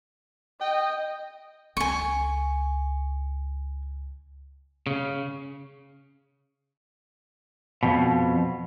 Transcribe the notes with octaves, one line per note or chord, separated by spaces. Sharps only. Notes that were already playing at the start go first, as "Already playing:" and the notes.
D#5 G5
C#2 G#5 C#6
C#3
F2 B2